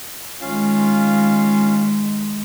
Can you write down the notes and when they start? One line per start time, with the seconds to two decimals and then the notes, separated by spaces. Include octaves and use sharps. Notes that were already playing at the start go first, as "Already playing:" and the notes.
0.41 D#3 G#3 C#4 F4 F5